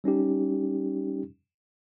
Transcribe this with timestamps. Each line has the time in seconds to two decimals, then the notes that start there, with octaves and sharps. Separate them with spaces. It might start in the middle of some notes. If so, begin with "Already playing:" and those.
0.04 G3 C#4 D#4 G4